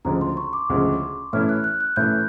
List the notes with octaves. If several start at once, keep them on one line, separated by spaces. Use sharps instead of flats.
D2 C#3 F3 G#3 A#5
C6
C#6
D6
D2 C#3 F3 G#3
A2 E3 A3 C#4 E4 F6
F#6
F#6
F#6
A2 E3 A3 C#4 E4 G6